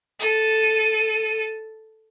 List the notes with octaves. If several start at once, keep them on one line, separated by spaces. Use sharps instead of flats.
A4 D#7